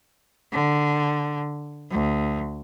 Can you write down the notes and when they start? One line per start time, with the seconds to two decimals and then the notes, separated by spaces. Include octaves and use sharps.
0.52 D3
1.91 D2